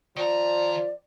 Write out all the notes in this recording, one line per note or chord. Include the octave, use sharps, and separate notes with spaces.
D#3 F3 D5 A#5